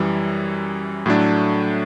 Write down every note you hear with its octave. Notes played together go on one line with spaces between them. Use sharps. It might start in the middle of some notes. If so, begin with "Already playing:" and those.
Already playing: F#2 E3 G3
A2 F#3 A3 D4